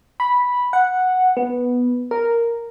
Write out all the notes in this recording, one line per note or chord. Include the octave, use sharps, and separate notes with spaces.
B5
F#5
B3
A#4